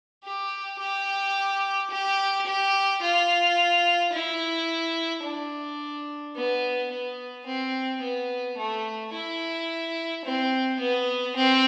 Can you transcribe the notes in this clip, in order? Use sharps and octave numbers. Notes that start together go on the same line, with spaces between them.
G4
G4
G4
G4
F4
E4
D4
B3
B3
C4
B3
A3
E4
C4
B3
C4